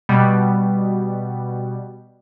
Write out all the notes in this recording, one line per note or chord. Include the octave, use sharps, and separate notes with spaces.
B2 G3 B3